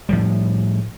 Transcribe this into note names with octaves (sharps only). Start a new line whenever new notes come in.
A2 F3 G3